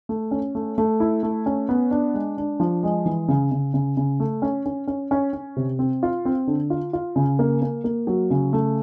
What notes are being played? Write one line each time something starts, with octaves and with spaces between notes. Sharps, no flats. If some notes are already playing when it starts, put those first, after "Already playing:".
A3
C#4
A3
A3
E4
A3
C#4
B3
D4
G#3
D4
F3
G#3
E3
C#3
C#3
C#3
C#3
A3
C#4
C#4
C#4
C#4
C#4
C3
C4
F4
C4
D3
F4
F4
C#3
A#3
A#3
A#3
F#3
C#3
A3